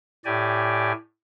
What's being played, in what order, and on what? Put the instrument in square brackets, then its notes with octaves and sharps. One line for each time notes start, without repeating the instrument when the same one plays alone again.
[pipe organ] A2 G4 D5 G#5